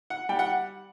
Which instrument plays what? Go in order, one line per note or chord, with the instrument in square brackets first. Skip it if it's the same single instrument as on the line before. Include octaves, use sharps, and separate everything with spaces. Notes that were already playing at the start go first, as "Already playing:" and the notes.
[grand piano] F#5
G3 G5
F#5